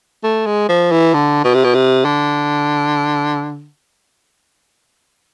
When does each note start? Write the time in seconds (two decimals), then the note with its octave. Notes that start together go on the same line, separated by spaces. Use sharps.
0.24 A3
0.46 G#3
0.69 F3
0.91 E3
1.14 D3
1.44 B2
1.54 C3
1.64 B2
1.74 C3
2.05 D3